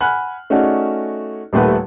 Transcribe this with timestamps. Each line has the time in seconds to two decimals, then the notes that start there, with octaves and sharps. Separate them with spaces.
0.01 F#5 G#5 B5 F6 F#6
0.50 A3 C#4 D#4 F#4 G#4 D5
1.53 D#1 D#2 A3 B4 F#5